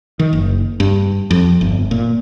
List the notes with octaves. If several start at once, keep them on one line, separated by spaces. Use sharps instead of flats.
D#3
F#1
G2
F2
G1
A#2